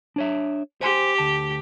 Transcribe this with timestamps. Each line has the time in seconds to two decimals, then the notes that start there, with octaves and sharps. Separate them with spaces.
0.16 D4 C#5 E5
0.81 G4 C5 G#5 C6
1.18 D2 A5